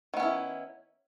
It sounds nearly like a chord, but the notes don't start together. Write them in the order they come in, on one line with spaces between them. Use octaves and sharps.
D#3 B3 C#4 E4